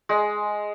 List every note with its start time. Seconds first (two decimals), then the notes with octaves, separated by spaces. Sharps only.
0.09 G#3